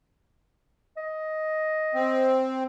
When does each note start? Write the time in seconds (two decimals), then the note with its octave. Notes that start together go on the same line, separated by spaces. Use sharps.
0.97 D#5
1.94 C4